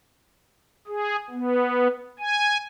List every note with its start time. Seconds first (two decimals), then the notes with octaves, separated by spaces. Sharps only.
0.88 G#4
1.30 B3
2.19 G#5